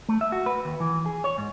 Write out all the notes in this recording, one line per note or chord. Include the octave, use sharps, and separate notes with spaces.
A3
E5
F#4
B4
D#2
E3
G#4
C#5
G#2